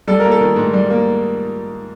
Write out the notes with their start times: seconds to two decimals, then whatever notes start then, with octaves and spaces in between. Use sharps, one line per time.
0.08 G3 A4
0.19 A#3 A#4
0.31 A4
0.41 D#3
0.56 G#2
0.73 G3
0.90 A#3